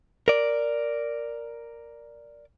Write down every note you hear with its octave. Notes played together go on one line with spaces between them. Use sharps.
A#4 D5